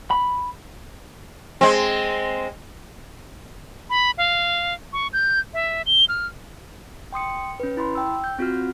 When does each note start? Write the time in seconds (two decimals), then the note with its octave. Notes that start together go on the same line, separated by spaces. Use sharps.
0.11 B5
1.61 G#3 C4
3.90 B5
4.18 F5
4.93 C#6
5.13 G6
5.54 E5
5.86 G7
6.09 F6
7.13 G5 C6 D#6 C#7
7.60 C#4 B4
7.77 E4 B5 C6
7.95 G5 E6
8.24 G6
8.39 C4 F4 F#4 F6